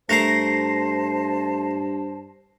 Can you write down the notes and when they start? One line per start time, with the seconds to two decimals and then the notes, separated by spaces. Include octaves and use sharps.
0.09 G2 A3 A#4 C5 A5 A#6 C7